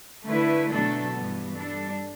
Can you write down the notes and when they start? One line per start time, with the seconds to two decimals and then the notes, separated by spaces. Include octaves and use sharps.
0.26 D3 A3 E4 B4
0.70 B2 F#3 A3 D4 A4
1.13 G2 E3 G3 B3
1.55 G3 D4 A4